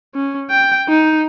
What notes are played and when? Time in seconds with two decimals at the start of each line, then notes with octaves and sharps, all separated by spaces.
0.15 C#4
0.50 G5
0.89 D#4